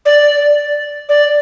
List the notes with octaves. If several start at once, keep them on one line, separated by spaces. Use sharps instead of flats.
D5
D5